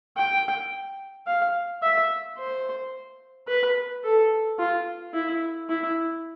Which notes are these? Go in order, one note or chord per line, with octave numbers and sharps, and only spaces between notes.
G5
F5
E5
C5
B4
A4
F4
E4
E4